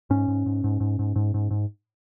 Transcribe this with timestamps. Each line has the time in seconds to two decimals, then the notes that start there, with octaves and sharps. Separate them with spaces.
0.10 G#2 C#4
0.28 G#2
0.46 G#2
0.64 G#2
0.80 G#2
0.99 G#2
1.16 G#2
1.34 G#2
1.51 G#2